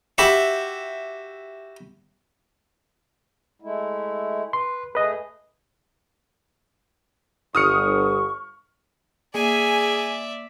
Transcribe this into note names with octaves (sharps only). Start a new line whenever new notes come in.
E4 F#4 G4 E5
G#3 A3 E4
B4 C6
A3 G#4 B4 D#5
G1 C#6 D#6 F6 C#7
A#3 G#4 D5 E5 G#5